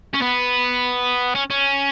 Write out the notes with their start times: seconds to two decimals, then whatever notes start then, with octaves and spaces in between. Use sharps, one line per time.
0.14 C#4
0.21 B3
1.35 C#4
1.50 C#4